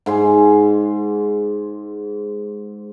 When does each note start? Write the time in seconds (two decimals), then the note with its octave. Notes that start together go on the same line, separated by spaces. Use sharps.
0.06 G#2 G#5 C6